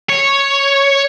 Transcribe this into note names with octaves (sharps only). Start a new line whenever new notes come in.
C#5